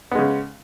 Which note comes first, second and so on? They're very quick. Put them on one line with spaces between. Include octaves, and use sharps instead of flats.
B3 G#3 C#3